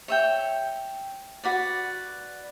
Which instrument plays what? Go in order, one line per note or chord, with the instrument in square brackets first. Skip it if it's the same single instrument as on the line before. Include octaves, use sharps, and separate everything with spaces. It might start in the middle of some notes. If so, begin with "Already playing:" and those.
[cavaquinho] C#5 E5 G5
F#4 B4 D5